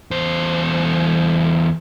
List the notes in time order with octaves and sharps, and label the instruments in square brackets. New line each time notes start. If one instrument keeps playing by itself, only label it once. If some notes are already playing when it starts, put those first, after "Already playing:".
[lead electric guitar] E2 C5